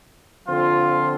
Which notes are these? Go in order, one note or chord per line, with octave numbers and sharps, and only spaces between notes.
D3 F3 C4 F4